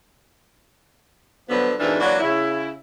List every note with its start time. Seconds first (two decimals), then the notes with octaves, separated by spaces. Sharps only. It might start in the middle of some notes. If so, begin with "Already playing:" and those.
1.49 G2 D3 F3 F#3 B3 B4
1.80 F2 G#2 B2 E3 D4 A#4
2.00 E3 F#3 A#3 D4 F#4
2.20 C#3 E4